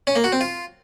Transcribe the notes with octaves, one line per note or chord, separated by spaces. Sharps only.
C#4
A#3
F#4
C4
F4